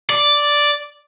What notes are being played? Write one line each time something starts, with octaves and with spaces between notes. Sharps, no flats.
D5